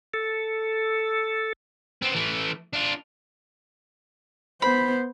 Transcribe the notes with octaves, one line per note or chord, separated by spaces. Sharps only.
A4
B3 C4
E3 A3
D4 F4
B3 C5 B5